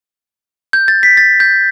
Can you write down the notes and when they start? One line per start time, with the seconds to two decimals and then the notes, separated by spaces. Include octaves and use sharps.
0.73 G6
0.88 A6
1.03 B6
1.17 A6
1.40 G6